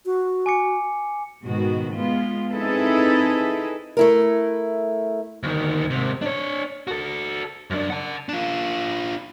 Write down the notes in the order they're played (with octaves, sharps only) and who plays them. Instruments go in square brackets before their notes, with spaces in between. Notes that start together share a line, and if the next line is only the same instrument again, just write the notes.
[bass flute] F#4
[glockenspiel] G#5 D6 C#7
[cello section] G#2 B2 D#3 F#4
G#3 B3 F4
C4 D#4 E4 G#4 A4 B4
[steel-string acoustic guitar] A3 E4 A#4
[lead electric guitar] D2 D#3
G#2 C3
D4 C#5
F#4 A4
F#2 D4
F#5 A5
D4 F4